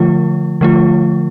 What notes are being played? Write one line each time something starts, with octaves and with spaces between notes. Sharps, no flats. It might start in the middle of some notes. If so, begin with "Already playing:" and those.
Already playing: D3 F3 A3 F4
D3 F3 A3 F4